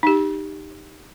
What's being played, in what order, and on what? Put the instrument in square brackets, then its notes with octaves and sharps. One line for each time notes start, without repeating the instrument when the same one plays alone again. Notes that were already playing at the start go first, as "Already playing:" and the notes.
[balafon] D#4 G4